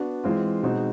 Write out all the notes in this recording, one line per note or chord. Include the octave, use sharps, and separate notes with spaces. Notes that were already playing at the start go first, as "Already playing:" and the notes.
Already playing: B3 D4 F#4
E3 G#3 C4 F4
B2 G#3 C4 D#4